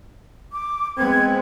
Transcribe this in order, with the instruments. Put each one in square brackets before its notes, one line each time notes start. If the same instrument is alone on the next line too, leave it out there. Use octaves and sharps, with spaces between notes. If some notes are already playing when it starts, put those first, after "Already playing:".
[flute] D6
[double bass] G#3 B3 [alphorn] C4 [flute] G#6